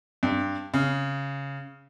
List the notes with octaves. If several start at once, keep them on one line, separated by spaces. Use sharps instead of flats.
G2
C#3